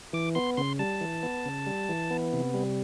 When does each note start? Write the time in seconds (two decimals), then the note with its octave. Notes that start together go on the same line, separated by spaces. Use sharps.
0.13 E3 D6
0.35 B3 C6
0.57 C#3 C6
0.79 G3 A5
1.01 E3
1.23 B3
1.45 C#3
1.66 G3
1.89 E3
2.10 B3
2.33 C3
2.54 G3